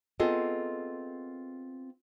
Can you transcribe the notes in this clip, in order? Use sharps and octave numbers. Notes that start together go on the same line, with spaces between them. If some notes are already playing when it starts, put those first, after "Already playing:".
B3 C4 F4 G#4 A4 D#5